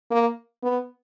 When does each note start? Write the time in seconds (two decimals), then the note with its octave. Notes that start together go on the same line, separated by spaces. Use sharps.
0.11 A#3
0.63 B3